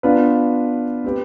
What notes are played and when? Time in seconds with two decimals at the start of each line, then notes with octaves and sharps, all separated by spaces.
0.03 B3 D4 F4 B4
1.04 C4 G4 B4